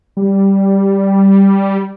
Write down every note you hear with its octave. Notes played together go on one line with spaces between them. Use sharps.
G3